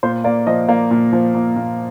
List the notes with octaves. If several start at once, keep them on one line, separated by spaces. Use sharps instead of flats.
A#2 C5
A#3 D5
F3 D#5
A#3 D5
A#2
F3
A#2
A#2